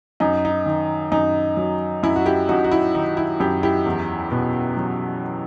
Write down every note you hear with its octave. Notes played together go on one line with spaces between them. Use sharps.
F#2 D#4
D#4
D#3
F#2 D#4
F#3
F#2 E4
F#4
E4 G4
F#2 D#4 F#4
F#4
E4
D#3 D#4
E4
F#2 E4 G4
E4 G4
E2
B2
F#3